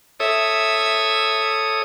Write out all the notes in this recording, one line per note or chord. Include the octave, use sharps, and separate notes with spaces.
A4 C#5 E5 D#6